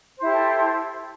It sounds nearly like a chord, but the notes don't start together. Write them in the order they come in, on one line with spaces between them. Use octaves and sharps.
C5 E4 G4 A4